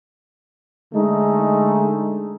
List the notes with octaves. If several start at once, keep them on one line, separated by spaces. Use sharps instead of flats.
D3 G#3 A3 D#4